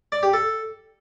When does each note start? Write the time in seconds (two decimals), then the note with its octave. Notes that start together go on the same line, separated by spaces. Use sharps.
0.12 D5
0.23 G4
0.33 A4